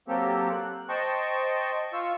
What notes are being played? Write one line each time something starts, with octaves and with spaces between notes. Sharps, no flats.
F#3 A#3 C4 G4 A4
F#6
C5 D#5 G5 A5 C#6
F4 C#6 E6